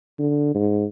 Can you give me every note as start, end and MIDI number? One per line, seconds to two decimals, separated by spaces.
0.19 0.54 50
0.55 0.85 44